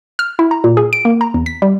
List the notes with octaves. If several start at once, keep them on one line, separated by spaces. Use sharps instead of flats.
F6
E4
A#5
A#2
G#4
D7
A#3
A#5
E2
B6
G3